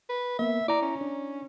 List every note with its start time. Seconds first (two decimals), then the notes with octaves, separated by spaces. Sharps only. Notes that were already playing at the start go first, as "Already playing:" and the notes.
0.09 B4
0.39 A#3 B3 E5
0.68 E4 D5 A#5
0.82 C#4
1.01 D4